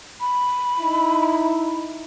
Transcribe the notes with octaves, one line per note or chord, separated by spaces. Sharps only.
B5
D#4 E4